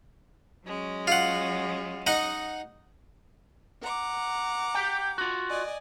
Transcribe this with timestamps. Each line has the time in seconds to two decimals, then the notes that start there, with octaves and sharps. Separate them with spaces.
0.66 F#3 G#3 C#4
1.07 F4 F#5
2.07 D#4 D#5 F#5
3.82 F#5 A#5 D6
4.75 G4 G5
5.18 F4 F#4
5.49 D5 D#5 G#5